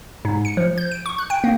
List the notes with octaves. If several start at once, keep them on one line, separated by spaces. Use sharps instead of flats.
G#2
C#7
F3
G6
D7
C#6
F#6
G5
A#3